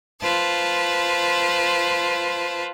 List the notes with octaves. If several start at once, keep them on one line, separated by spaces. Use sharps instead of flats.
F4 B4 C5 A5